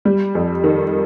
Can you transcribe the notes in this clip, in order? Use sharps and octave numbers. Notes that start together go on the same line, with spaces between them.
G3
F2
D#3